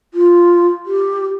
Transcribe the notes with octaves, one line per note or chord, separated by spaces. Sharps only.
F4
G4